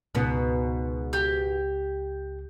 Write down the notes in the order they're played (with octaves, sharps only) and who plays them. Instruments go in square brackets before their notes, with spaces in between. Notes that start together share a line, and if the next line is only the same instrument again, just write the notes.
[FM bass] C#2 [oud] G#2 B2 B3
[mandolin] G4